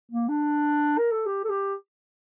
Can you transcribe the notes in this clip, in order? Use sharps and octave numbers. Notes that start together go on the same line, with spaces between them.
A#3
D4
A#4
A4
G4
A4
G4